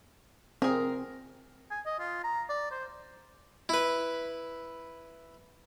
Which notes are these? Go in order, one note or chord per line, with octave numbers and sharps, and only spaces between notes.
C4 G#4 A#4
G#5
D#5
F4
A#5
D5
C5
E4 B4